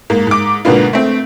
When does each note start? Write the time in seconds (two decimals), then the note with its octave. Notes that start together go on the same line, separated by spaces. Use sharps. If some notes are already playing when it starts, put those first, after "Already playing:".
0.10 G#2 A#3
0.27 G#2 D6
0.65 G#2 B2 D3 A#3 B3 F4
0.93 A3 C4